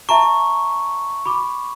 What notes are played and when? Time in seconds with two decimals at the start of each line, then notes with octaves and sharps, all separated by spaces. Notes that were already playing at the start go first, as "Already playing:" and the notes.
0.09 E5 A5 A#5 C#6
1.25 B5 D6